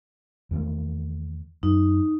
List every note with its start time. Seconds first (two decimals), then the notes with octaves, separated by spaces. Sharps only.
0.51 E2 D#3 A3
1.63 F#2 D#4